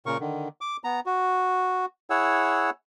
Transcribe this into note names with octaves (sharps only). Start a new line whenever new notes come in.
A#2 C#3 A#4 C#6
D3 D#3
D6
B3 A#5
F#4
E4 G#4 C#5 F#5 E6